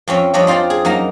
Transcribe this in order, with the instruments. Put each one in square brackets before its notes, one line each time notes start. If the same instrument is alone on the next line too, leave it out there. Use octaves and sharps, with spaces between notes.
[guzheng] F2 C4 C#4 E5
F2 G3 C#4 D4 D#5
C4 F4 C5 D5 G5
G#4
F#2 A#3 D#4 A#5